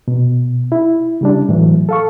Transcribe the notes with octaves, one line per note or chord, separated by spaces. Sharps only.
B2
E4
C#3 G3 D4
A2 E3 F#3
A4 F5 C#6